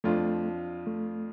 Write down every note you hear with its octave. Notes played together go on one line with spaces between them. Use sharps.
F2 F3 A3 D4 F4
A3